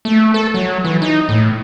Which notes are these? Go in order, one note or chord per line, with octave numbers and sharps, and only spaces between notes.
A3
A4
F#3
E3
D#4
A2